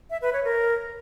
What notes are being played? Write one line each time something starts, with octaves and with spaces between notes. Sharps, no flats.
E5
B4
C#5
A#4